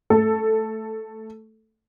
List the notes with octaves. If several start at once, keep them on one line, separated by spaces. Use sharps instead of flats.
A3 A4